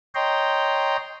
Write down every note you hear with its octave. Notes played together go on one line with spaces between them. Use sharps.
C#5 D#5 G5 A#5 C6